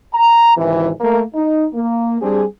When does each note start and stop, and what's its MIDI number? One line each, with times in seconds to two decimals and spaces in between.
0.14 0.53 82
0.57 0.89 32
0.57 0.89 37
0.57 0.89 48
0.57 0.89 52
1.01 1.22 57
1.01 1.22 58
1.01 1.22 70
1.35 1.66 63
1.73 2.21 58
2.22 2.44 55
2.22 2.44 60
2.22 2.44 62
2.22 2.44 67
2.22 2.44 68